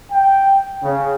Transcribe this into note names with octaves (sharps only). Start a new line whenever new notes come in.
G5
C#3